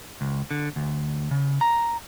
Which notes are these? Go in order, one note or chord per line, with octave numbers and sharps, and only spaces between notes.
C#2
D3
D2
C#3
A#5